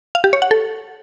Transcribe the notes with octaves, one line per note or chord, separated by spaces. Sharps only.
F5
G4
C#5
F#5
A4